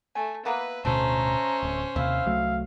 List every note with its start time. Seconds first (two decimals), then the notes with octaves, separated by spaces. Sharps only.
0.15 A3 G#5
0.45 A#3 B3 E4 B4
0.85 D1 D2 B2 A3 C#4 C5 A#5
1.63 D1
1.96 D#2 C3 E4 F5
2.26 C2 F#3 A3